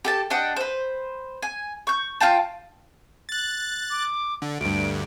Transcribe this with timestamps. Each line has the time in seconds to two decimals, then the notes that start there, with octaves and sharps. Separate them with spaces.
0.05 G4 A4 A5
0.30 D4 D#5 F#5 G5
0.56 B4 C5
1.42 G#5
1.87 C#6 G6
2.20 F4 F5 G5 A5
3.29 F#6 A6
3.90 D6
4.42 D3
4.61 D2 G2 D7